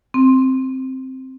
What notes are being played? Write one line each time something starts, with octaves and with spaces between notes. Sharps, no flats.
C4